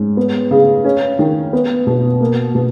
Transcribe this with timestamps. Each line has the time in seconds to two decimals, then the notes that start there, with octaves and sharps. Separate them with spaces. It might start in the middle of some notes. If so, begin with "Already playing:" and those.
Already playing: G#2 C#4
0.17 B3
0.51 C#3
0.85 C#4
1.19 D#3
1.53 B3
1.87 B2
2.21 A#3
2.55 B2